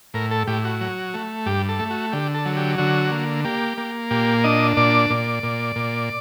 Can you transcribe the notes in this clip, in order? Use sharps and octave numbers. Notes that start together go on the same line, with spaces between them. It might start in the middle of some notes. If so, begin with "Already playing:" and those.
A2 A#4
A4
A2 G4
F#4
F#3
A3
G2 G4
A4
A3
F#4
D3 G4
A4
F#3
G4
D3 F#4
A#3
A#3 G4
A#3
A#2 G4
D4 D#5
A#2 D5
A#2
A#2
A#2